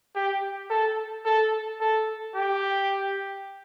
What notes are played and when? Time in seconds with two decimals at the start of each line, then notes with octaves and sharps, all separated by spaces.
0.16 G4
0.70 A4
1.25 A4
1.81 A4
2.35 G4